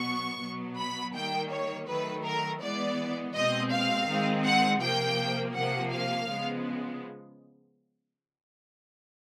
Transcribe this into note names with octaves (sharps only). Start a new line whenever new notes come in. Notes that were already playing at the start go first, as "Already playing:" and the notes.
Already playing: B2 F#3 B3 C#6
B2 F#3 B3
B5
D#3 G3 A#3 G5
C#5
D#3 F#3 A3 B4
A#4
E3 G#3 B3 D5
B2 G#3 C4 D#5
F5
D#3 G#3 C4
F#5
C3 F3 A#3 G5
C3 F3 A#3 F#5
F5
C#3 F3 G#3 B3